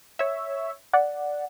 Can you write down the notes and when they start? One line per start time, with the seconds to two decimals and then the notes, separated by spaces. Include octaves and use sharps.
0.19 C#5 E5
0.93 D5 F#5